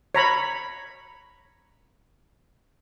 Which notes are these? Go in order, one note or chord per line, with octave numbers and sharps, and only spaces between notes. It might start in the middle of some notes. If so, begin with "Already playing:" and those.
C#5 A#5 B5